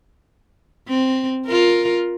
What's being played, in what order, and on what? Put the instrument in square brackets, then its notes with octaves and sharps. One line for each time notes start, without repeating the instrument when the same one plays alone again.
[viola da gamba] C4
F4 A#4